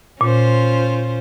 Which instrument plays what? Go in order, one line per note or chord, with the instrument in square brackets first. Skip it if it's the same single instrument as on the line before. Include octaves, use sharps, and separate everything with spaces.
[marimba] A#2 [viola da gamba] C#4 F4 C5